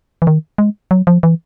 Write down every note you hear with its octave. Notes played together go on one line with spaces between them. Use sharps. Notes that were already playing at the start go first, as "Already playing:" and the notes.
E3
D#3
G#3
F#3
F3
E3